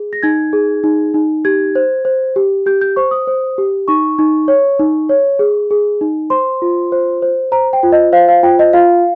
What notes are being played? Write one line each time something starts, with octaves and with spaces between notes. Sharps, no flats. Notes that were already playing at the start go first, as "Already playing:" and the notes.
Already playing: G#4
A#6
D#4 G#6
G#4
D#4
D#4
G4 G#6
C5
C5
G4
G4 G6
G6
C5 C#6
D#6
C5
G4
D#4 C#6
D#4
C#5
D#4
C#5
G#4
G#4
D#4
C5 C6
F4
C5
C5
C5 A#5
G5
F4
D#5
C5 F5
F5
F4 G5
D#5
F4 F5